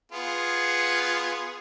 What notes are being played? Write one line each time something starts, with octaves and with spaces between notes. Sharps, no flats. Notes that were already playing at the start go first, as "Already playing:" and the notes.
B3 F4 G#4